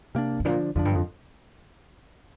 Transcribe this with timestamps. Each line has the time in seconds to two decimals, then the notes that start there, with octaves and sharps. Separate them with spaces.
0.15 C3 A#3 D4
0.40 G2
0.45 A#2 D3 F3 D4
0.75 F2 D3 F3 D4
0.85 G2
0.95 F2